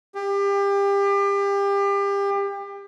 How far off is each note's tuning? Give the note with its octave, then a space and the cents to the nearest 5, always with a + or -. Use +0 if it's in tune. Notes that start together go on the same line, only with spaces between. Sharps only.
G4 +30